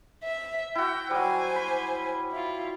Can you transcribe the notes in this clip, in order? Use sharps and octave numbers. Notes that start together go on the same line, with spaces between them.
E5
E4 F#4 G5
F#3 G3 C5 G#5
B5
E4 F4